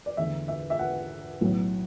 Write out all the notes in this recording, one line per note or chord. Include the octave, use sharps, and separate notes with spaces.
D5
E2 D3 A3 E5
E5
E5
F#5
B1 A2 F#3